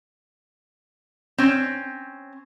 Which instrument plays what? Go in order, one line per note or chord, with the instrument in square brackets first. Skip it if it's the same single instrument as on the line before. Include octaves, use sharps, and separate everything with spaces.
[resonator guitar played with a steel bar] C4 C#4